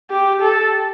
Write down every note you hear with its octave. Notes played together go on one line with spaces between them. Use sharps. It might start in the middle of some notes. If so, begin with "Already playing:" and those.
G4
A4